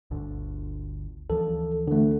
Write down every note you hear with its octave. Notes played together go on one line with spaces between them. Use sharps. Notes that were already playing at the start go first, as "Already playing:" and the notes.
G1 D2 D3
D2 E3 F3 A4
D3 A3